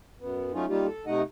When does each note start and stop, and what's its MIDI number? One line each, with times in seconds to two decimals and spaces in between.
0.20 0.52 42
0.20 0.52 59
0.53 0.65 54
0.53 0.65 57
0.53 0.65 61
0.53 0.65 63
0.53 0.65 65
0.68 0.86 55
0.68 0.86 58
0.68 0.86 63
0.68 0.86 65
0.68 0.86 67
0.86 1.05 69
1.07 1.22 48
1.07 1.22 57
1.07 1.22 63
1.07 1.22 75
1.07 1.22 78